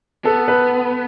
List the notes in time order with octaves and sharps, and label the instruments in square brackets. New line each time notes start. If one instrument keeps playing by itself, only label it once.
[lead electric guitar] B3 [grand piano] A4
[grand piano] B4